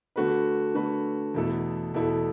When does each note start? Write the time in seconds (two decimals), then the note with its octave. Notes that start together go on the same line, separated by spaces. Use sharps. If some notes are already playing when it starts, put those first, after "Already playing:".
0.16 D3 A3 F#4 B4
0.74 D3 A3 F#4 B4
1.34 E2 B2 A3 E4 A4
1.94 E2 B2 A3 E4 A4